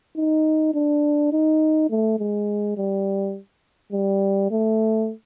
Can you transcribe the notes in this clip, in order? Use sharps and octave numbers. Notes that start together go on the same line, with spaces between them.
D#4
D4
D#4
A3
G#3
G3
G3
A3